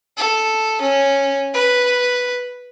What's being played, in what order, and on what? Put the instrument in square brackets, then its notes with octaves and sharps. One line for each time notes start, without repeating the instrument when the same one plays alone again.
[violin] A4
C#4
B4